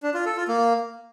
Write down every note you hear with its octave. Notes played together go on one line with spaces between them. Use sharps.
D4
F4
A4
F4
A#3